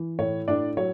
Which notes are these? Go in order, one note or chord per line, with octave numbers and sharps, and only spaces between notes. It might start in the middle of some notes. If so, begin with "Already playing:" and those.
Already playing: E3
A2 C#5
A2 D4 D5
F#3 C#5